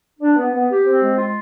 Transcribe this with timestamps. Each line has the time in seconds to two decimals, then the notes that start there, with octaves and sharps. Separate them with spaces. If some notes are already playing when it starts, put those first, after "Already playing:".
0.20 D4
0.36 B3
0.53 B3
0.69 G4
0.84 C4
1.00 G#3
1.17 F4